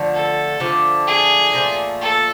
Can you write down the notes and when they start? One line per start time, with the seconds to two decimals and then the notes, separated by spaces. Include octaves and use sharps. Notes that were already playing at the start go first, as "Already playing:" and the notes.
Already playing: D3 F3 A3
0.14 A4
0.60 D3 F3 A3 D4
1.07 G#4
1.53 A#2 F3 A3
2.01 A4